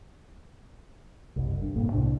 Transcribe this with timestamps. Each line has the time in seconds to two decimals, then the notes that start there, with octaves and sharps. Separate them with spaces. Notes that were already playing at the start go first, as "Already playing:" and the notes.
1.36 F#1 C2
1.61 G2
1.76 C2 A2 C3 A#3
1.92 C2 C3 D4